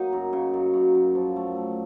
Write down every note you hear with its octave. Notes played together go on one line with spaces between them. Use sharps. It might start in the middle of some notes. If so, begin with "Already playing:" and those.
Already playing: F#3 A#3 D#4
F#2
C#3
F#2
F#2
F#2
F3
A3
A3